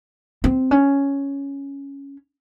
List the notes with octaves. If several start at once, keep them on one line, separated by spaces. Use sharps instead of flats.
C4
C#4